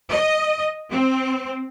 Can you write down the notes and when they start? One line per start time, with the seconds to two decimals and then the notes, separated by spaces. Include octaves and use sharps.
0.10 D#5
0.90 C4